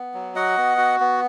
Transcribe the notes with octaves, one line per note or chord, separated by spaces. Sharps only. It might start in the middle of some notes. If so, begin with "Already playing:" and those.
Already playing: B3
F#3
F#4 D#5 F#5
B3
F#4
B3